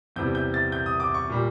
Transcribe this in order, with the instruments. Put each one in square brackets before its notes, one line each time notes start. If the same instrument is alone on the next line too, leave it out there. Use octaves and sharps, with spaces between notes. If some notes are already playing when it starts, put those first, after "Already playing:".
[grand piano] E2 C3 E3 G3 G6
G6
A6
G6
D#6
D6
C#6
A#2 G3